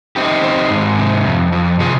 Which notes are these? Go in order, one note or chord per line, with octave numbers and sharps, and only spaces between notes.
C4 D#4 G4
C4
G#2
C3
F2
F2
C3 F4 G#4